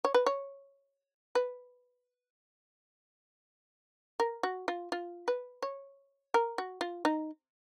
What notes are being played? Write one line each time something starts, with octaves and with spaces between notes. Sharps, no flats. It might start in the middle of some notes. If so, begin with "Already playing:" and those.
C#5
B4
C#5
B4
A#4
F#4
F4
F4
B4
C#5
A#4
F#4
F4
D#4